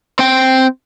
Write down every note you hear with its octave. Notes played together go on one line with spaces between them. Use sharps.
C4 G5